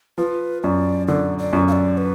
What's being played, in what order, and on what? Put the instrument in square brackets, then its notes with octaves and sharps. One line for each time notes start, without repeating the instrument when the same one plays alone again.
[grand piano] F3 [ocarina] B4
[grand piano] F#2 [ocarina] D5
[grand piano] D3 [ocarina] D5
[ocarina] D5
[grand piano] F#2
[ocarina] F5
D5
B4